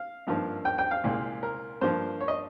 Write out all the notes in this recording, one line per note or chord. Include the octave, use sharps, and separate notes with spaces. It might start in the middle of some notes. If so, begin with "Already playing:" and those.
Already playing: F5
G#1 G2 F3 A#3
G5
G5
F5
C2 A#2 G#3 C4
A#4
G2 F3 A#3 C5
C#5
D#5